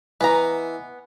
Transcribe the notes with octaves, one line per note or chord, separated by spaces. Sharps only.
E3 B3 D#5 G#5 A#5